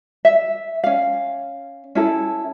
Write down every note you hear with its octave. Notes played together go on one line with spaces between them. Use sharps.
E5
C#4 F5
C#4 E4 A4